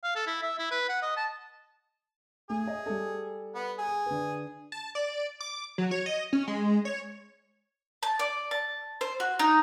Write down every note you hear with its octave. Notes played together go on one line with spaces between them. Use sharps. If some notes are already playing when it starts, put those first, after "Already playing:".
F5
A4
E4
E5
E4
B4
F#5
D#5
A5
A3 G#4
D#5 E5
G3 A4
B3
G#4
D3 B4
A5
D5
D6
F#3
C#5
D#5
C#4
G#3
C#5
A5
D5
A5
C5
F#4
D#4